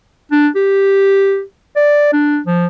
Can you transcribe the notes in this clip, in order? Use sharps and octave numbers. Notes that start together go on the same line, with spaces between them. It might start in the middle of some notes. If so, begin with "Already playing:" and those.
D4
G4
D5
D4
F3